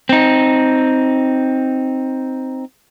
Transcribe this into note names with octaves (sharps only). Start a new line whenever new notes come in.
C4 D#4